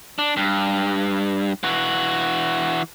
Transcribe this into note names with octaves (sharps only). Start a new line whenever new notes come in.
D4
G2
E3 F#4